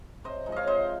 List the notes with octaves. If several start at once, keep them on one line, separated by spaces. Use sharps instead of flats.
C3 C5 D#5
F3 G#3 D#4
C#5 D#5 F5
C3 C5 D#5